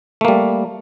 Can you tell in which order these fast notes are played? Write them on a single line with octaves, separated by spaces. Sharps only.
A3 A#3 G3